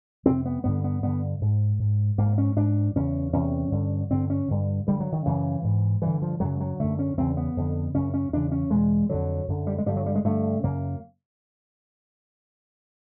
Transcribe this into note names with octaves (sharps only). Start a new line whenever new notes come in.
F2 C3 C4
B3
G2 D3 B3
B3
G2 D3 B3
G#2
G#2
G#2 A#3
C#4
G#2 D4
E2 C#3 C#4
E2 C3 C#4
G2 D3
G2 D3 C4
C#4
G2 D3
G2 D3 G3
F#3
D#3
F#2 C#3 E3
G#2
G2 D3 E3
F3
F#2 C#3 F#3
F#3
F#2 D3 A3
C#4
E2 C#3 C4
B3
F2 D3
F#2 C#3 C#4
C#4
E2 C#3 D4
C#4
E2 B2 G#3
F2 D3 F#3
F#2 D3
G3
G#3
G2 D3 G3
F#3
G3
G#3
G2 D3 A3
F#2 C#3 A#3